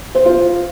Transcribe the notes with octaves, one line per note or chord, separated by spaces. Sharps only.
C5
F4